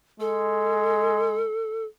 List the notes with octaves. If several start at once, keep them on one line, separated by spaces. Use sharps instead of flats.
G#3 A4